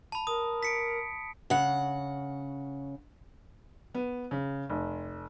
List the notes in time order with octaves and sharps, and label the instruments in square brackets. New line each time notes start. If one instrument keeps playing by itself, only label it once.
[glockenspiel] A5 B5
[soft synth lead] A#4 [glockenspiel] D#6
[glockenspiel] B6 C#7 D7
[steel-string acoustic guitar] C#3 F#5
[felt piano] B3
C#3
F1